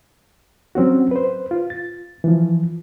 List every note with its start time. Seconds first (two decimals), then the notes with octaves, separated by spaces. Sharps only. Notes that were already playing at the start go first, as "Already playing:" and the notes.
0.75 F#3 C4 C#4 F#4
1.11 B4 C5
1.51 F4
1.70 A6
2.24 E3 F3